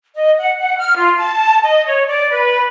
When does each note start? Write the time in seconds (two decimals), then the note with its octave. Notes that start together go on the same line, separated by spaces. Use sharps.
0.15 D#5
0.39 F#5
0.59 F#5
0.78 F6
0.97 F4
1.18 A5
1.64 D#5
1.86 C#5
2.07 D5
2.30 B4